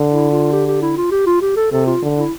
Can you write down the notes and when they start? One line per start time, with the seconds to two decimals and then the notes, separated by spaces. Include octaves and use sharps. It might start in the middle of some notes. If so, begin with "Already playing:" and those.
Already playing: D3
0.11 E4
0.31 F4
0.52 G4
0.67 G4
0.82 E4
0.97 F4
1.11 G4
1.27 F4
1.42 G4
1.56 A4
1.72 C3 A4
1.86 F4
2.02 D3
2.17 E4